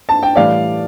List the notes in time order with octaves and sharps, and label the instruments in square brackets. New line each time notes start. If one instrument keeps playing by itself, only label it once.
[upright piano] A5
G5
A2 E3 G3 D5 F5